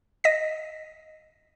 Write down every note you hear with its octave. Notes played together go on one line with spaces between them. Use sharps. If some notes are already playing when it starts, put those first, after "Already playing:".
D#5 A#6 B6